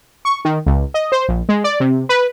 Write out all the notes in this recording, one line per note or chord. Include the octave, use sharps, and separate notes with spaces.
C#6
D#3
C#2
D#5
C5
A#1
G#3
D5
C3
B4